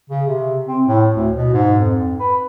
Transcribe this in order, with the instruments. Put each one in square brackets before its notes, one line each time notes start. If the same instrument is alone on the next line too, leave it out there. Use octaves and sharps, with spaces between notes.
[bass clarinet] C#3
C3
C4
A2
D2
B2
G#2
F2
B4